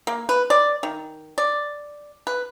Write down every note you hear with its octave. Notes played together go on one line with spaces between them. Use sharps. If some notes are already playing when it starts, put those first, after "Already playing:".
A#3
B4
D5
D#3
D5
B4